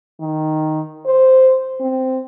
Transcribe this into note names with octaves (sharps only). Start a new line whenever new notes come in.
D#3
C5
C4